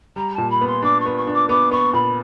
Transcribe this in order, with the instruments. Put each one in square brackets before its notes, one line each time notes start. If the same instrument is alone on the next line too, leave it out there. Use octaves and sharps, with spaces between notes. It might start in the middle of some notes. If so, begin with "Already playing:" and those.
[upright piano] G3 [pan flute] A#5
[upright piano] A#2 [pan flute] A5
[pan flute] B5
[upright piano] B3
[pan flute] C6
[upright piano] D4 [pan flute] D6
[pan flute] C#6
[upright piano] B3
[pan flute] C#6
[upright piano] D4
[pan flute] D6
[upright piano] B3 [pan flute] D6
[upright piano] B3 [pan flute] C#6
[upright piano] A#2 [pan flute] B5